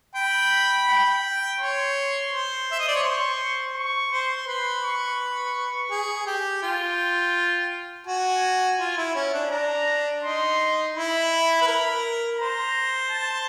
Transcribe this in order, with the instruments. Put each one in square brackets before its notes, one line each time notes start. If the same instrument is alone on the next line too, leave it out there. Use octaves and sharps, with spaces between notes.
[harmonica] G5 [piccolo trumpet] B5
[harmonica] G5
[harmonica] C#5 [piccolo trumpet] C6
[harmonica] C5
E5
D#5
D5
C#5
[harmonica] C5 [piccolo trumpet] C#6
[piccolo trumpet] C#6
[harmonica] C5
[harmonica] B4 [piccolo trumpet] C6
[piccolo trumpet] C#6
C#6
[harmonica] G#4
G4
[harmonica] F4 [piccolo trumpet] G5
[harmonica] F#4 [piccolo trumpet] G#5
[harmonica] F4
E4
C#4
D4
[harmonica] D4 [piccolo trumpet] A#5
[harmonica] D#4 [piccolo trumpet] C6
[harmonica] E4 [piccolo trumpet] B5
[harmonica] B4
A#4
[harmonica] C5 [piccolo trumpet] A#5
[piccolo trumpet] A5